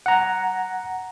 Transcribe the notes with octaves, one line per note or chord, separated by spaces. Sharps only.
F#5 A#5